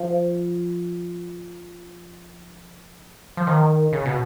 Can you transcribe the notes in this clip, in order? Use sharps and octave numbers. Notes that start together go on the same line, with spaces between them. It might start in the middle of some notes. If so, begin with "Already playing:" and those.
Already playing: F3
F3
D#3
C#3
B2